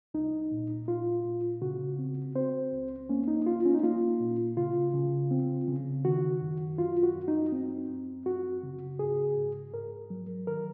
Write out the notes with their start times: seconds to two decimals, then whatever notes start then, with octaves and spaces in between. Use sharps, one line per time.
0.14 C2 D#4
0.51 A#2
0.88 A#2 F4
1.25 A#2
1.62 C#3 F#4
1.99 C4
2.35 C4 C5
2.72 C#2
3.09 A#3 C#4
3.28 D#4
3.46 C2 F4
3.65 C#4
3.75 D#4
3.83 A#3 F4
4.20 A#2
4.57 C#3 F4
4.94 C#3
5.31 C4
5.68 C#3
6.05 D#3 F#4
6.42 F#2
6.78 F#2 F4
7.03 F#4
7.15 F#2
7.28 D#4
7.52 C4
7.89 F#2
8.26 F#2 F#4
8.63 C#3
8.99 G#2 G#4
9.36 G#2
9.73 G#2 A#4
10.10 F#3
10.47 D#3 A#4